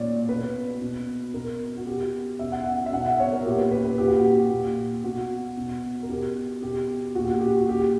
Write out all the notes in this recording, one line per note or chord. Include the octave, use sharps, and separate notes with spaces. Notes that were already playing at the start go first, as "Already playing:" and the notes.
Already playing: A#2 C#5 D5
B2 B4
B2
B2 A#4
F#4
B2 G4
B2 E5
F#5
E5
E5
B2 F#5
E5
C#5
A#4
A#2 G4
B4
B4
B4
A#2 G4
F#4
G4
A#2
B2 F#4
B2
A#4
B2 G4
B2 G4
A#2 F#4
G4
F#4
G4
F#4
A#2 G4